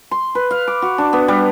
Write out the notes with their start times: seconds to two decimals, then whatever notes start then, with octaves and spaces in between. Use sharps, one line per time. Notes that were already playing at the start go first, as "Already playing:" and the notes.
0.11 C6
0.35 B4
0.51 F5
0.67 D6
0.82 F#4
0.98 D4
1.13 B3
1.28 G3